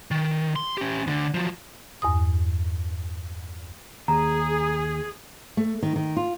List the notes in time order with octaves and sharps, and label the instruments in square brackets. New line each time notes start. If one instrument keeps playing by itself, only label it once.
[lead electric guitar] D#3
C6
C#4 G4
D2 D3
F3 F#3
[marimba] E2 G2 D#6
[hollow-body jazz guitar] D#2 [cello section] G#4 [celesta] A#5
[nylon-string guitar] A3
D#3
D#3
F4